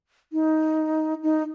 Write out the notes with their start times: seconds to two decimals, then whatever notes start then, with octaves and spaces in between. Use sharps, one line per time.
0.33 D#4
1.23 D#4